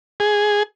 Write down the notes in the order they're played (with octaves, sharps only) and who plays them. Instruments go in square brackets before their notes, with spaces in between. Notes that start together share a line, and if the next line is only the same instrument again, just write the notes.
[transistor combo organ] G#4